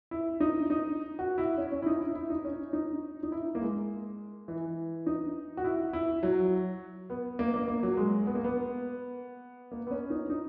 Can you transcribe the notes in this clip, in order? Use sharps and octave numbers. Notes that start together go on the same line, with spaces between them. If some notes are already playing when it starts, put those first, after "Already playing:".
E4
D#4
D#4
F#4
E4
C#4
C#4
E4
D#4
E4
E4
D#4
C#4
D#4
D#4
E4
A#3
G#3
E3
D#4
F#4
E4
E4
F#3
B3
A#3
A#3
A#3
F#3
G#3
B3
A#3
B3
A#3
B3
C#4
D#4
D#4